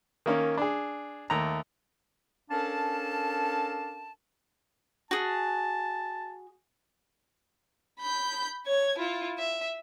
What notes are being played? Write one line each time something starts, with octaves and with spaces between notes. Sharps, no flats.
D#3 A#3 C#4
D4 G#4
D#2 A3 A#5
C#4 D4 A4 A#4 F5 A5
F#4 G#4 A5
B5 G6
C#5 G#6
E4 F4
E5